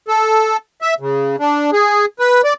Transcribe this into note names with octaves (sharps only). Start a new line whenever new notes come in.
A4
E5
C#3
D4
G#4
B4
D5